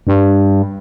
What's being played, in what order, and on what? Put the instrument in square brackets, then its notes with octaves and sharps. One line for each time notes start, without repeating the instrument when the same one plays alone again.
[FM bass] G2